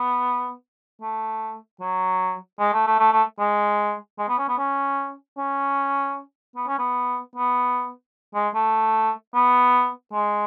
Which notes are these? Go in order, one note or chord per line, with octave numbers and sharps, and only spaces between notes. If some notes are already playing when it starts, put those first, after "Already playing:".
Already playing: B3
A3
F#3
G#3
A3
A3
A3
A3
G#3
G#3
B3
C#4
B3
C#4
C#4
B3
C#4
B3
B3
G#3
A3
B3
G#3